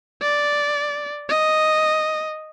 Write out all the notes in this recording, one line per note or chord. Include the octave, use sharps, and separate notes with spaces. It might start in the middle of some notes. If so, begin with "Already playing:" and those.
D5
D#5